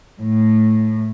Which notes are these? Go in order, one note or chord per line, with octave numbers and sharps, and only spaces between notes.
A2